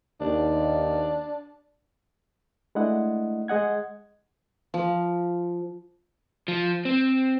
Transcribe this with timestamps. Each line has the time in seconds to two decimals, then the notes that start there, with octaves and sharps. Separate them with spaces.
0.21 D#2 D4
2.75 G#3 A3 D4 E4 D#5 F#5
3.48 G#3 G#4 D#5 F#5 G#6
4.74 F3
6.48 F3
6.85 C4